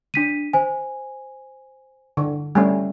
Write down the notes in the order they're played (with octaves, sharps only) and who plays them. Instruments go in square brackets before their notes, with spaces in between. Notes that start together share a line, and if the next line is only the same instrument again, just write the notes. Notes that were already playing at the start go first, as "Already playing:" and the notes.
[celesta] D4 B6 D#7
C5 G#5
[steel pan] D3
[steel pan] G3 A3 C#4 [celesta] G#5